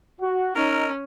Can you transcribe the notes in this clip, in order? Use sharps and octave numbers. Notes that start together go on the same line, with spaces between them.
F#4
C#4 D#4 A#4